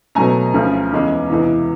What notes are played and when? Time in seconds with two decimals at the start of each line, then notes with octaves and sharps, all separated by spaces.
0.15 B2 F#3 A3 G#5 A#5
0.54 D2 C#3 F3
0.92 E2 C#3 E3 G#3
1.30 E2 C3 E3 G#3